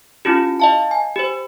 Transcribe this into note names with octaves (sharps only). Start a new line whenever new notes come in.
C#4 E4 F4 G4
D#5 F5 A5
G#5
G4 C5